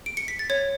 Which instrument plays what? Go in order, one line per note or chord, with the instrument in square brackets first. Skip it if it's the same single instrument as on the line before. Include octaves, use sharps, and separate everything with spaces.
[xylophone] D7
C#7
B6
A6
C#5 G#6